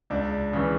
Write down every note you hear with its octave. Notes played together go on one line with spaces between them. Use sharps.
C#2 D4
C#3 E3